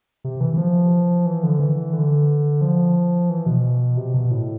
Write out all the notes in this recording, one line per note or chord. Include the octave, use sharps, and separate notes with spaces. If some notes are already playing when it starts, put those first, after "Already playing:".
C3
E3
E3
F3
E3
D3
E3
D3
F3
E3
B2
C3
B2
A2